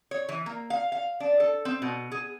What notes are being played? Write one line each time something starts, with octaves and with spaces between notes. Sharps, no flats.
C#5
E3
A#3
F5
F5
D4
A4
C4
B2
G#4